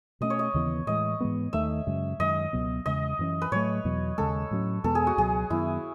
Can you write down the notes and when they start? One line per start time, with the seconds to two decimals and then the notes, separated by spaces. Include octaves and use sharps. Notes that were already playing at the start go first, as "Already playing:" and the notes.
0.21 B2 A3 C#4 D#5
0.30 C#5
0.39 D#5
0.54 D#2 C#3 E3 B3
0.87 A2 E3 G#3 D#5
1.20 G#2 E3 G#3 B3
1.53 D#2 D#3 A3 E5
1.87 F#2 C#3 G#3 C#4
2.19 F#2 D#3 G#3 D#5
2.53 C#2 B2 F#3 B3
2.86 E2 C#3 G#3 D#5
3.19 F#2 E3 A3 C#4
3.42 B4
3.52 A2 F#3 A3 C#5
3.85 E2 B2 F#3
4.18 D#2 C#3 G#3 A4
4.51 A2 F#3 C#4
4.84 E2 B2 G#3 B3 A4
4.95 G#4
5.07 F#4
5.17 C#2 B2 F#3 G#4
5.50 F#2 D#3 F#3 B3 E4